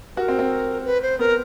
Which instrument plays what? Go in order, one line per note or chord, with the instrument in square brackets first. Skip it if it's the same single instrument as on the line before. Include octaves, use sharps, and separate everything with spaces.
[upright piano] F#4 [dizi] A#4 B4
[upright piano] C4
C4
[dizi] B4
C5
[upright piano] B3 [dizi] A#4